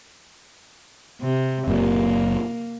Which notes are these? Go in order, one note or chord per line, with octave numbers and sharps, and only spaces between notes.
C3
F#1 A#2 A#3